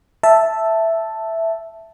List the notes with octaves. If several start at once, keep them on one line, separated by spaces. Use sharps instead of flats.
E5 A5